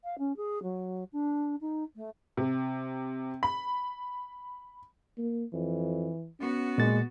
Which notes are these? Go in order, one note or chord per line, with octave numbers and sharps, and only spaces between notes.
F5
C#4
G#4
F#3
D4
D#4
A3
C3
B5
A#3
F2 E3
B3 C#4 F#4
A#2 G#3 A#3 A6